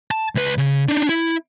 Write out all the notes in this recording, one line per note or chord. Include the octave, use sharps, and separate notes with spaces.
A5
C#2 B4
C#3
D4 D#4
E4